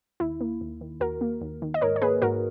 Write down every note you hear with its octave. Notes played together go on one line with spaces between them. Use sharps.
D#2 E4
A#3
D#2
D#3
D#2 F#4 A#4
A#3
D#2
D#3
D#5
G#2 A#4 C#5
C#5
A#3 G#4 B4
G#2 F#4 A#4